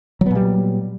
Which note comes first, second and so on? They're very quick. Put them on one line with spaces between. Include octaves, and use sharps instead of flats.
F#3 B3 A#2 G3